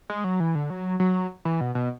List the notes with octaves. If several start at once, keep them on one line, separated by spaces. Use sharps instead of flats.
G#3
F#3
E3
D3
F#3
F#3
E3
B2
B2